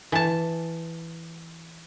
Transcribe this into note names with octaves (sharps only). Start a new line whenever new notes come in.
E3 A5